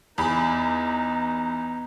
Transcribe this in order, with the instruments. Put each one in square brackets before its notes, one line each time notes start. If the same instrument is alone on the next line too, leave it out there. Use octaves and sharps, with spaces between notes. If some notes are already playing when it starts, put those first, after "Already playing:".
[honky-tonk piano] E2 B5 [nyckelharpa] B3 D#4